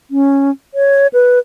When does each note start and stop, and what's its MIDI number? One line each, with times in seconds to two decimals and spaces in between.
0.11 0.51 61
0.74 1.07 73
1.13 1.39 71